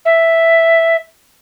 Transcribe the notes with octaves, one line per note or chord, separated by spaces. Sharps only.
E5